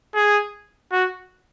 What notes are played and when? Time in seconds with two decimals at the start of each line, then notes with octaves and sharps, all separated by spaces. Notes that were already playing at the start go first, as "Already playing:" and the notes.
0.15 G#4
0.92 F#4